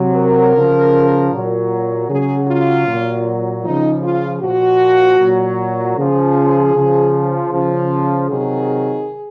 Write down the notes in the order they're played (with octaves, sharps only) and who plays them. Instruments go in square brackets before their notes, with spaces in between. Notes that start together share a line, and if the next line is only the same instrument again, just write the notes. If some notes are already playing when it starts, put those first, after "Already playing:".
Already playing: [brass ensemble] C3 F#3
A#4
C#3 F3
A#2 F#3
C#3 F#3 G#4
F4
A#2 F#3
C#3 F3 D#4
F4
A#2 F3 F#4
A#2 F#3
C#3 F3 G#4
C#3 F3
C#3 F3
C3 D#3 F#3 G#4